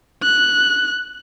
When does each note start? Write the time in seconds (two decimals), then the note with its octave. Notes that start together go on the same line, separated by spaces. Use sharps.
0.23 F#6